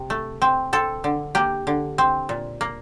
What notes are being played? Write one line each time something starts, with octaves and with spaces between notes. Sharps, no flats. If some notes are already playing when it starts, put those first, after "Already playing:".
Already playing: C3
A3
C4
C4 A4
D3
A#3 G4
D3
C4
A#2
A#3